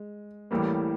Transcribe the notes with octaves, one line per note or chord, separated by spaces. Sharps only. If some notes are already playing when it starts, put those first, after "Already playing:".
Already playing: G#3
A1 A2 E3 G3 A#3